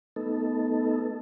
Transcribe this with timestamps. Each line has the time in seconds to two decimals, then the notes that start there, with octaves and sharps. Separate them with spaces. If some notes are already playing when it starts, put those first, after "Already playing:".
0.16 A3 B3 D#4 A4